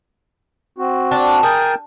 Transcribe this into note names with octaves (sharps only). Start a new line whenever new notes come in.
C4 F#4
D4
G#4 A#4 G5 A5